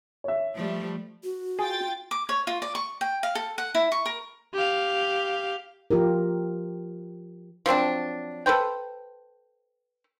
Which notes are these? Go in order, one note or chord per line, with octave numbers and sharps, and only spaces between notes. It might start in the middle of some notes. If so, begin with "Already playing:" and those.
C#5 E5
F3 G3 A3
F#4
F4 G#4 G5 A6
D6
C#5
F4
D5
C#6
G5
F5
A4
F#5
E4
C#6
A#4
G4 F5
F3 F4 G4 A#4
F3 F#3 C4 D4
A4 B4 C5 G5